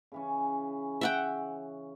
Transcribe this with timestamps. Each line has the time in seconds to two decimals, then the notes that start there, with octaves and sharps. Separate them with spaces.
0.12 C#3 E3 C#4
1.01 E5 F#5 G5